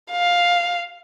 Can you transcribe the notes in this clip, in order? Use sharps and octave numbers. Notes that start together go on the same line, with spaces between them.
F5